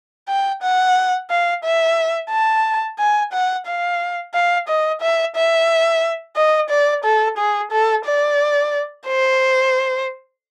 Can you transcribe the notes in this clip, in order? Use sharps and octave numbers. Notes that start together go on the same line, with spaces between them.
G5
F#5
F5
E5
A5
G#5
F#5
F5
F5
D#5
E5
E5
D#5
D5
A4
G#4
A4
D5
C5